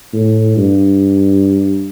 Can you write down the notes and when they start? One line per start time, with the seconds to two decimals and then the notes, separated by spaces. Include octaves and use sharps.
0.13 A2
0.57 G2